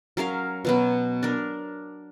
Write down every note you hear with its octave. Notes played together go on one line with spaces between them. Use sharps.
F#3 C#4 A#4 F5
B2 F#3 B3
D4 A#4